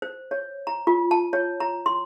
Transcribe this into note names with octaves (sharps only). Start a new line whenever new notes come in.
C5
C#5
A#5
F4
A5
C#5
A#5
C6